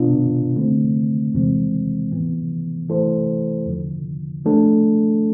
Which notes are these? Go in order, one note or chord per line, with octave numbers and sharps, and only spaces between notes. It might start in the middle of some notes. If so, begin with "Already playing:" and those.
Already playing: B2 B3 D4 F4
D3 A3 C4
E2 C3 E3 G#3 C4
A2 E3 B3
E3 A3 E4 A4 C5
E2 D3 F3
F3 A3 D4 A4